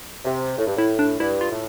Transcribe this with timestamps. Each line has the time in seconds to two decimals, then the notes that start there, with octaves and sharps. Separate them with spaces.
0.25 C3
0.57 A2
0.67 G2
0.76 A2 E4
0.99 D4
1.20 G2 E4
1.41 F4
1.51 A2